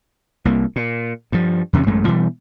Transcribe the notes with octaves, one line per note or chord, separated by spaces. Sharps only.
C2 A#3
A#2
G2 F3
E2 C3 D#3 C#4
A1 F#2 G#3 A3
B2 E3 G3